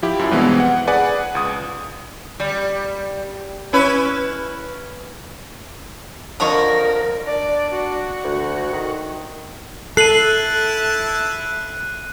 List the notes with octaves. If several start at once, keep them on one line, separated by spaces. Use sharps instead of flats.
F3 E4 G4
F#2 E4
G2 B2 E3 G#3 B3 C4
F#5
G#4 B4 D5 F#5 G#5
C#2 D#6
G3
C#4 E4 B4
F2 D3 A#4 A#5 C#6 D#6
D4 D5
F#4
D2
D#3
E4 A4 A5 F#6 C7 D#7 F#7